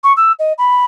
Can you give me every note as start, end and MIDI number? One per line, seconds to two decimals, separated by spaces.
0.04 0.13 85
0.17 0.32 88
0.39 0.53 75
0.58 0.85 83